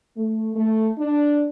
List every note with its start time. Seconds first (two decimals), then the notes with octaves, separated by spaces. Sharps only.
0.16 A3
0.56 A3
0.99 D4